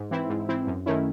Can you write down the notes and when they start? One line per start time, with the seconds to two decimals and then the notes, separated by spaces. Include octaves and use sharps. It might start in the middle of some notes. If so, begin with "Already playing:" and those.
Already playing: G#2
0.11 E3 C4 E4
0.29 G#2
0.48 E3 C4 E4
0.67 F#2
0.86 D#3 A3 C#4 E4